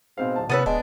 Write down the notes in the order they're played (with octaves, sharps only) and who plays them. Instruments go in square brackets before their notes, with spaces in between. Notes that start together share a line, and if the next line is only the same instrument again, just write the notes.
[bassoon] G#2 [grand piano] B2 C4 F5
[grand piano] D1 A5
[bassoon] E2 [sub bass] C3 [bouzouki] B3 C#4 B4 [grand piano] E6 A6 D#7
[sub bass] D1 [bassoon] G#3 [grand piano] B3 [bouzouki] D4